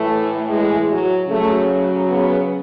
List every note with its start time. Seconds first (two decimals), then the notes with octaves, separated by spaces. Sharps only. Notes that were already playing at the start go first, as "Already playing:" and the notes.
Already playing: A2 E3 A3
0.50 G#3
0.90 F#3
1.29 C#3 F#3 A3
2.09 B3